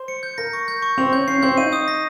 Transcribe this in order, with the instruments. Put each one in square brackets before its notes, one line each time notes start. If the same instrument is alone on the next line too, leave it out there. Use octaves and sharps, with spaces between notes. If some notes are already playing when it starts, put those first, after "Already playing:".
Already playing: [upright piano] C5
[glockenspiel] C#7
G6
[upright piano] A#4 [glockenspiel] A#6
[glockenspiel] C#6
G6
C#6
[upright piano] C4 [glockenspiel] F7
[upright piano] C#4 [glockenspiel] G6
[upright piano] C#4 [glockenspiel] C7
[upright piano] C#4
[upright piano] C4 [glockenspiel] G6
[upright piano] D#4 [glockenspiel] D#7
[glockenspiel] D#6
A#6